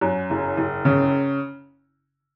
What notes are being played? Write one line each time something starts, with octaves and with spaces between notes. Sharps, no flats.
F#2
F#1
F#1
C#3